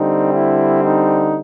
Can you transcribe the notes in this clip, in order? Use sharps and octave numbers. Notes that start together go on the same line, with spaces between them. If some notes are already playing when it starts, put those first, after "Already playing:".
Already playing: D3 G3 C4 D#4
E4
D#4